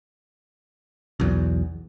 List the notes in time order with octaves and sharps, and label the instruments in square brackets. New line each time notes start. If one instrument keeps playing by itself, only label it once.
[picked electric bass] B1 E2